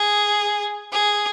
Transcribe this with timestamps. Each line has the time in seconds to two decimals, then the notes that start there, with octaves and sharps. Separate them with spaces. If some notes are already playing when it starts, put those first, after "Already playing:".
Already playing: G#4
0.92 G#4